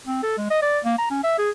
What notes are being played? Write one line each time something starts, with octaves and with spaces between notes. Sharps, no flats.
C4
A4
G#3
D#5
D5
A#3
A#5
C#4
E5
G#4